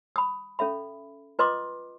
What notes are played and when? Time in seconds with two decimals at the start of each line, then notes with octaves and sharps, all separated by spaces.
0.16 B5 D#6
0.59 C#4 A4 E5 B5
1.39 F4 B4 D#5 C6 D6 D#6